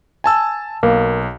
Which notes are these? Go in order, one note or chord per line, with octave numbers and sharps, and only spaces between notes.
G#5 A5 E6
B1 A#3